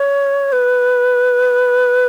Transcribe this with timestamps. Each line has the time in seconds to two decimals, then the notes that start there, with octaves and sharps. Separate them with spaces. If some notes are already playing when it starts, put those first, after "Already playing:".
Already playing: C#5
0.52 B4